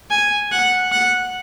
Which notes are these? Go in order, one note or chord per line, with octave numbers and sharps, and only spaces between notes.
G#5
F#5
F#5